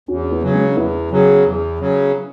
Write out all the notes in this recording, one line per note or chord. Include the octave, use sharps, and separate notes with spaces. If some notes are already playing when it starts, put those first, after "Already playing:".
E2 C#4 F#4
B3 E4
C#3 F#3
G#3 C#4
E2 B3 E4
C#3 F#3
E2
C#3 F#3